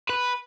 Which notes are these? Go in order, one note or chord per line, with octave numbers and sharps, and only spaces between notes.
B4